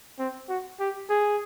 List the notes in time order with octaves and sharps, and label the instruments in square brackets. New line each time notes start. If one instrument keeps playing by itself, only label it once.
[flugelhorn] C4
F#4
G4
G#4